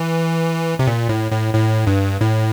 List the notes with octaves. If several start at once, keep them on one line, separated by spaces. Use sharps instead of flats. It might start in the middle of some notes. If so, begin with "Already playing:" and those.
Already playing: E3
C3
A#2
A2
A2
A2
G2
A2